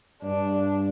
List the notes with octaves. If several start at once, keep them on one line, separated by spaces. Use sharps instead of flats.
G2 D4